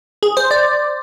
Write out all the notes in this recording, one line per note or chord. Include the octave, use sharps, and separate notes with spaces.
G#4
C5
D5